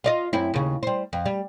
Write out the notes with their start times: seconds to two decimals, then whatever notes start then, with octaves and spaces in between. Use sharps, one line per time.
0.04 F4 D5 D#5
0.33 F#2 C4 E4
0.54 D#2 C#3
0.83 G3 C5
1.13 F2
1.25 G3